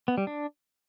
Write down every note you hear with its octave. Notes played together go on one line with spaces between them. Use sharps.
B3
G3
D4